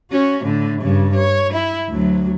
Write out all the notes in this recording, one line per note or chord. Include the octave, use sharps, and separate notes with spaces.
C#4 F#4
A2 D3
G2 C#3
C#5
E4
D2 F#3